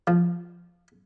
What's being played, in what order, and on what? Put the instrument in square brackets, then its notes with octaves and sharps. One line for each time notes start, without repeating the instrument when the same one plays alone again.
[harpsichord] F3